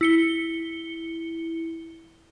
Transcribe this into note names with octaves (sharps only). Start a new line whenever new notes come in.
E4 C#7 G7